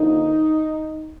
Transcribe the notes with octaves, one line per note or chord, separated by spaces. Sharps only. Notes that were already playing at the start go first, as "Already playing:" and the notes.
Already playing: D3 F3 A#3 D#4